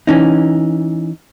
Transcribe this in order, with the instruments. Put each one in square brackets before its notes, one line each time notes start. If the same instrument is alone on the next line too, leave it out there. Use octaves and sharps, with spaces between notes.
[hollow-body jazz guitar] E3 C#4 D#4